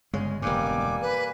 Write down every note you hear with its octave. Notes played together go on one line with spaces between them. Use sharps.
G1 C#3 G#3 C#4
E1 G2 G3 A#3 G#5 D6
B4